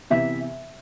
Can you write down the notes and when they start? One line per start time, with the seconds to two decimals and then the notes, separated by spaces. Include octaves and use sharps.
0.10 C3 E3 B3 E5